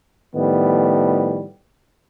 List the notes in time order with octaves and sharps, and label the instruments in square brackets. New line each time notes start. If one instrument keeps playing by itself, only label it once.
[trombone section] A2 D#3 F3 G3 B3